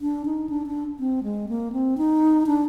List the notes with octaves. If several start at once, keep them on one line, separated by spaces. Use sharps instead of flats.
D4
D#4
D4
D4
C4
G#3
A#3
C4
D#4
D4